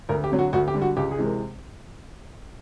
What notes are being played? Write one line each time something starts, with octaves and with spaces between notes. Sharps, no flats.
D2 A#4
G4
D3 F#3
F#4
D2 F#4
G4
D3 G3
F#4
C#2 G4
G#4
C3 E3 G#3
A#4